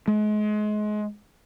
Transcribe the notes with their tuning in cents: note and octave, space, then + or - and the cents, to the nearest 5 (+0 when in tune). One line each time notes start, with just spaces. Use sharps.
G#3 +30